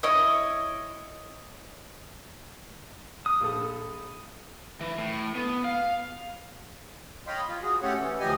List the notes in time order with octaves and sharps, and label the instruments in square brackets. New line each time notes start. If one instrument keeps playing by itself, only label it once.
[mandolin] E4 C#5 D#5
[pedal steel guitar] D#6
[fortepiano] A#1 A4
[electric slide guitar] E3
A2
B3
F5
[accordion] C#5 D#5 F5 G5 B5 C6
F4
F#4 G#4
A3 C#4 G4 A4 C#5 F#5
E3
D2 F3 G4 D#5 G#5